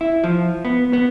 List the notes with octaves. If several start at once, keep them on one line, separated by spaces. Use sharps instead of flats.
E4
F3
B3
B3